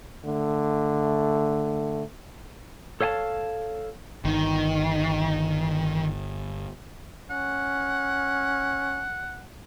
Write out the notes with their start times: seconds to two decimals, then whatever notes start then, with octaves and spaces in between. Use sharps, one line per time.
0.24 D3 A3
3.01 A4 C#5 F5 G#5 A5
4.25 G1 D#3
7.30 C#4 F#5